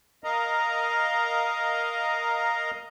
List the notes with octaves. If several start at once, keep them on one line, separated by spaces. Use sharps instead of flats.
A#4 D#5 F5 A#5